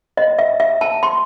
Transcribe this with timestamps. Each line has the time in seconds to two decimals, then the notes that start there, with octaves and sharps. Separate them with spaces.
0.17 D#5
0.39 E5
0.60 E5
0.81 A5
1.03 C6